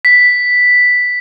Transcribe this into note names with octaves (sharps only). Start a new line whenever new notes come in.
B6